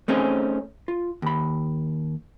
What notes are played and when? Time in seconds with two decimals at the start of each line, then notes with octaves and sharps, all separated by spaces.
0.08 A3 C4 C#4 D#4 G#4
0.88 F4
1.22 D#2 B5